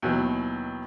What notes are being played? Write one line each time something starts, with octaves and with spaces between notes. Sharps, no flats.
D#2 B2 E3 F#3